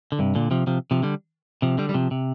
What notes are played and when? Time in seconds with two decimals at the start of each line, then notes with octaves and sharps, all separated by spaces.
0.12 D3
0.19 G2 C3
0.35 A#2 D3
0.51 C3 F3
0.67 C3 F3
0.91 C3 F3
1.03 D3 G3
1.62 C3 F3
1.78 D3 G3
1.89 G3
1.94 C3 F3
2.11 C3